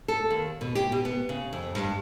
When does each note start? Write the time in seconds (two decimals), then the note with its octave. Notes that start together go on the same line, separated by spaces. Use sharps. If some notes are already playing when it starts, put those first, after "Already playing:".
0.08 A4
0.30 D#2
0.61 B2
0.75 G4
0.92 B2
1.05 B3
1.29 C#3
1.53 F2
1.75 G2